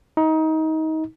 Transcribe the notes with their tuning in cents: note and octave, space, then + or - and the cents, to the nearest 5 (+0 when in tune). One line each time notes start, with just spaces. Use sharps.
D#4 +25